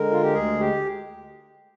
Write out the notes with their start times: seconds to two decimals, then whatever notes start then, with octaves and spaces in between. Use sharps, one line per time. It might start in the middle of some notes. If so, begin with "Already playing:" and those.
Already playing: D3 G#3 A#4
0.11 F4
0.22 G4
0.33 D2 G#4
0.60 G4